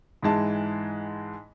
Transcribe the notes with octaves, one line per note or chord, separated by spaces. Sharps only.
G#2 E3 G#3 A5